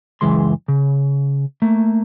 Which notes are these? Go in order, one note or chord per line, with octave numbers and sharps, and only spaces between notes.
C#2 F#2 E3 G#3 C6
C#3
A3 A#3